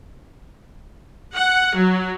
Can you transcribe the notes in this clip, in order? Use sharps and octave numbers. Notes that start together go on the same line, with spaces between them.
F#5
F#3